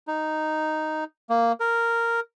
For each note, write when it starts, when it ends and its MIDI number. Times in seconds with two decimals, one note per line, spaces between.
0.07 1.04 63
1.30 1.52 58
1.60 2.20 70